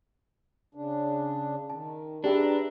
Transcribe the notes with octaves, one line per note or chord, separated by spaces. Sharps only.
C#3 D4
D#3 A5
D4 G4 G#4 B4 E5 G5 A#5